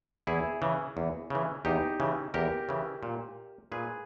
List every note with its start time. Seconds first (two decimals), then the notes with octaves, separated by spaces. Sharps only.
0.27 E2 E4 G#4
0.62 C#3 E3
0.97 E2
1.30 C#3 E3
1.65 E2 D#4 G4
2.00 C#3 E3
2.34 E2 G4 A#4
2.69 C#3 E3
3.03 A#2
3.72 A#2 G#4 B4